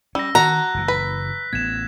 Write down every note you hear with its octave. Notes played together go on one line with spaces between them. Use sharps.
G3 C#4 E6 A#6
D#3 F#4 A#5 F#6
F#1 F#2 E3
B4 B6
A1 B3 G#6 E7